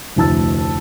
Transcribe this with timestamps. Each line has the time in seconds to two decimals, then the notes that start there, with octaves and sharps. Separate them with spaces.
0.16 F1 D2 E4 A5 E6 A6